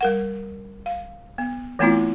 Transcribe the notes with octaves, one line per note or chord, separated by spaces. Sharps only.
G3 A#4 F#5
F5
B3
E3 A3 B3 C4 E4 F4